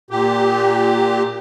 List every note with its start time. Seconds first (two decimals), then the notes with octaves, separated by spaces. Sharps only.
0.10 A#2 G4